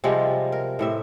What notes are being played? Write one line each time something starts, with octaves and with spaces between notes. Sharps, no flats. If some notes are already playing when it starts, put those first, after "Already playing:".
C3 F3 G3 G#3
A#4
A2 C3 E5